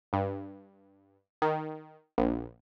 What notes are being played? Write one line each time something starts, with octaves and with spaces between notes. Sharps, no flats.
G2
D#3
A#1